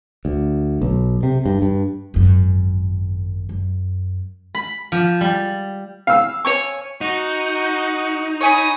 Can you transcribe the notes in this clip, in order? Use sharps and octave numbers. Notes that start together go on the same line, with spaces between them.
D2
B1
C3
G2
G2
G#1 F#2
F#2
B5
F3
G3
F5 E6
C#5 G#5 C#6
D#4 F#4
C#5 G#5 B5 D#6